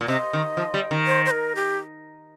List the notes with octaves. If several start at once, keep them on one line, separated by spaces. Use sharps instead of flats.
A#2
C3 D#5
D#3
F3
G3
D#3
C5
C5
A#4
G4